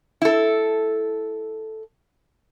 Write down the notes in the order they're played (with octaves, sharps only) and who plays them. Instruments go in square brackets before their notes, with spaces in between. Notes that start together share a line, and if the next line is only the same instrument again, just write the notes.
[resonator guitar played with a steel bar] E4 A4